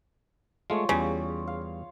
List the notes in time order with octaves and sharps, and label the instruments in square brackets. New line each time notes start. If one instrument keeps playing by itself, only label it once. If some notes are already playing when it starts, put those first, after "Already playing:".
[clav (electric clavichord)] G#3 A3 [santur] F4 C#5
[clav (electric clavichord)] E2 G3 [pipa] C#3
[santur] F5